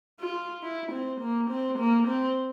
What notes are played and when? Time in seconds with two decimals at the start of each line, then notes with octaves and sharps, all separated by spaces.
0.20 F4
0.63 E4
0.92 C4
1.21 A#3
1.50 C4
1.79 A#3
2.08 C4